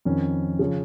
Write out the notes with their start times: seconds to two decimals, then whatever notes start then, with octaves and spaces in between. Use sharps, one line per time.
0.05 F2 D#3 C#4
0.59 C#3 F3 C#4